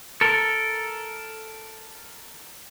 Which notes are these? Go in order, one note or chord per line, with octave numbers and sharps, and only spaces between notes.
A4 A#4